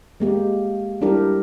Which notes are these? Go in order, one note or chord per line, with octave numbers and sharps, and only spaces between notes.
G#3 A#3 G4
G3 D4 E4 G4 A#4